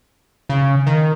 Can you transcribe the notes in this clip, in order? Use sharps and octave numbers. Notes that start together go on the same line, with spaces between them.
C#3
D#3